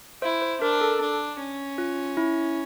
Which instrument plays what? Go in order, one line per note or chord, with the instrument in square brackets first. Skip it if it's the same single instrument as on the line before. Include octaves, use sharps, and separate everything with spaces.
[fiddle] E4 [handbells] C5
[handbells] C5
[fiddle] D4 [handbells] A#4
[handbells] A4
[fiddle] D4
C#4
[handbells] F4
E4